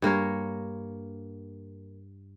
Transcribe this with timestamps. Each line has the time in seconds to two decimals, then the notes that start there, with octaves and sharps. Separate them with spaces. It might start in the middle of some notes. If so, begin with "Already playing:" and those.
0.02 G2 A#3 A#4 C#5